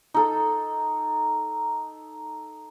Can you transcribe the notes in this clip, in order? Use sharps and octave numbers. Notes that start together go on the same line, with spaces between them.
D#4 A4